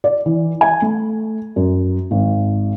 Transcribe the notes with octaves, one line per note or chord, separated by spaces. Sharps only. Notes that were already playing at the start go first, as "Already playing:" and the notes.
D5
E3
G#5
A3
F#2
G#1